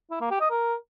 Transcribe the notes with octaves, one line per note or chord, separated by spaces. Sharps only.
E4
A#3
G4
D#5
A#4